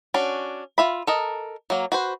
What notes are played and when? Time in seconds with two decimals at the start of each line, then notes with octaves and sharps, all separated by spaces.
0.14 C#4 D4 F#4
0.78 F4 E5 B5
1.07 A4 A#4 D#5
1.70 F#3 A#3
1.92 F#4 B4 C5